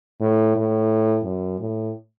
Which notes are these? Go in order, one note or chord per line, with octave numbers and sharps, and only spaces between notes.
A2
A2
F#2
A2